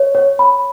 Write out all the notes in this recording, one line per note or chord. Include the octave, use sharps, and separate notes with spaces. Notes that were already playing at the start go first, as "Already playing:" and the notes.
Already playing: C#5
C#5
B5